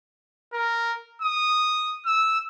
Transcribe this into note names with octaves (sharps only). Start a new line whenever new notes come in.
A#4
D#6
E6